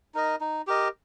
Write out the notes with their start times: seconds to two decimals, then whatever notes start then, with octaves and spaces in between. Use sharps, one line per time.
0.14 D#4 A#4 D#5
0.41 D#4
0.67 G4 A#4 D#5